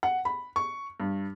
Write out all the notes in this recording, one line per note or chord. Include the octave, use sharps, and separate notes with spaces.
F#5
B5
C#6
G2